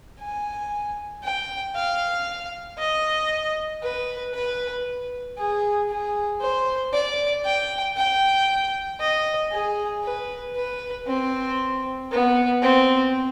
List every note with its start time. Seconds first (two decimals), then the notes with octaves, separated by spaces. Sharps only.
0.20 G#5
1.23 G5
1.75 F5
2.78 D#5
3.82 B4
4.34 B4
5.38 G#4
5.89 G#4
6.41 C5
6.93 D5
7.45 G5
7.97 G5
9.00 D#5
9.51 G#4
10.03 B4
10.56 B4
11.07 C4
12.11 B3
12.62 C4